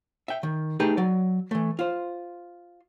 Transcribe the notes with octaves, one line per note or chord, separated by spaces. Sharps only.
E5 G5
D#3
A3 D#4 G4 G#4 B4
F#3 D5
E3 A3
F4 C5